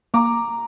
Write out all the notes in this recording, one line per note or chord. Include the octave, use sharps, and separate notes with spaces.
A#3 A#5 D6